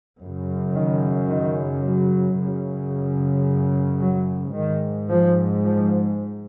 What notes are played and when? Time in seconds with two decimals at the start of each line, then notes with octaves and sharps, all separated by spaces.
0.19 F#2
0.25 C#3
0.74 D#3
1.29 D#3
1.83 F#3
2.37 F#2 C#3
4.00 F#3
4.55 G#2 D#3
5.10 F3
5.64 F3